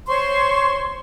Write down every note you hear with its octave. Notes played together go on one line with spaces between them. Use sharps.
C5 C#5 C6 C#6